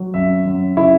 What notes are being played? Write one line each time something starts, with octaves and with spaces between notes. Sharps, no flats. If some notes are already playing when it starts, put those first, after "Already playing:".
Already playing: F#3
F#2 E5
F#2
C#3 E4